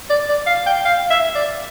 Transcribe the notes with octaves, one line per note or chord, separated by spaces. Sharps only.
D5
D5
F5
G5
F5
E5
D5